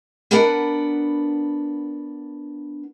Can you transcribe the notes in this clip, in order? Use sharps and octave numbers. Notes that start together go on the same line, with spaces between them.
B3 D4 A#4 B4 F#5